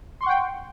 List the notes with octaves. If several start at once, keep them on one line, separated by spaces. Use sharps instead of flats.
F#5 G5 C6 C#6